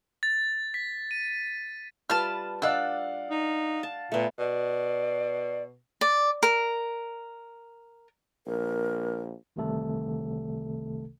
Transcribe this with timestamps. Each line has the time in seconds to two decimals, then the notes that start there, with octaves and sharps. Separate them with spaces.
0.23 A6
0.74 B6
1.11 D#7
2.10 G3 F4 B4 A5 F6
2.62 D4 D5 F5 F#5 E6 F#6
3.30 D#4
3.83 A5
4.12 A#2 A3 B3
4.39 B2 D5
6.01 D5
6.43 A#4
8.47 A#1 A#4
9.56 G1 C2 C3 D#3 A3 A4